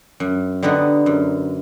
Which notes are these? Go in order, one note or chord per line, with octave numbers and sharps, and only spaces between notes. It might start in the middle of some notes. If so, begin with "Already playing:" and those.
F#2
D3 G3 B3 D#4
F#2